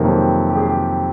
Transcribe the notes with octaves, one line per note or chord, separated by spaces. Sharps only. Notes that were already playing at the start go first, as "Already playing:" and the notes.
Already playing: F2 C3 D#3 F#3 A#3
G4
G4
G#4
G4